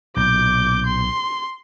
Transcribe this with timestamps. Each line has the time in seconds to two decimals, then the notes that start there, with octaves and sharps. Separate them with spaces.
0.16 B1 A#2 D6 G6
0.86 C6